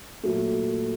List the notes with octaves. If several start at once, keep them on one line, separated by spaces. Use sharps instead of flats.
A#2 F#3 A3